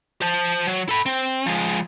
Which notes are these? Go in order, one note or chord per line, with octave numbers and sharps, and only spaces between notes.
C5 A5
F#3
A4 B5
C4
F3 G#3